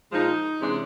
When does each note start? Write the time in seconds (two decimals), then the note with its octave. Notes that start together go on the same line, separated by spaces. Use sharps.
0.12 A#2 F3 G#3 D#4
0.61 C3 E3 G#3 C#4 D4